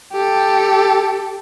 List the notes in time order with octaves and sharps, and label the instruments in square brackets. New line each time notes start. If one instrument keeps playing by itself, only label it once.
[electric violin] G4 A4